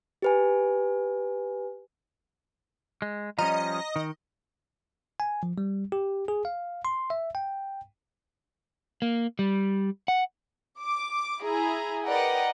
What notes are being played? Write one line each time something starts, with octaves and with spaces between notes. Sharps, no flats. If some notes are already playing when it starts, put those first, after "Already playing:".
G4 B4 G#5
G#3
F3 G3 C#4 D#5 A#5
D#3
G#5
F3
G3
G4
G#4
F5
C6
E5
G5
A#3
G3
F#5
D6
E4 G#4 A#5
A#4 B4 D5 D#5 F#5 G5